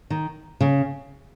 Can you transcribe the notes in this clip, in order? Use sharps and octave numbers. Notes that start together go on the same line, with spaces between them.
D#3
C#3